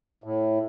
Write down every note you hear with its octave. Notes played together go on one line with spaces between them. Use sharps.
A2